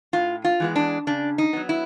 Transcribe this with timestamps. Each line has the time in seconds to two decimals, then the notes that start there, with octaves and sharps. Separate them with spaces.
0.13 A2 F4
0.44 F4
0.60 E3 G#3 B3
0.76 D4
1.07 C#3 D4
1.38 D#4
1.53 F#3 B3
1.69 E4